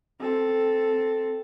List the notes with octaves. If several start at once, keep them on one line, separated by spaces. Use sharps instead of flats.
C4 A4